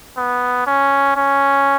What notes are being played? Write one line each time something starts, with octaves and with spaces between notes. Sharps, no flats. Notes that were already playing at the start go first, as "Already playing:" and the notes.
B3
C#4
C#4